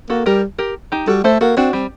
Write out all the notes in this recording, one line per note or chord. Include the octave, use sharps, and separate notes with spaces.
A#3 F#4 A4
G3 G4 A#4
G4 A#4
D#4 G4
G3 F#4 A4
A3 A4 C5
A#3 F#4 A4
C4 D4 F#4
G3 C4